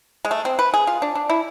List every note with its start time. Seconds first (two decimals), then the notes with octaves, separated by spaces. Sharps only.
0.25 G#3
0.31 A3
0.45 C4
0.59 B4
0.74 G#4
0.87 F4
1.02 D4
1.15 D4
1.30 E4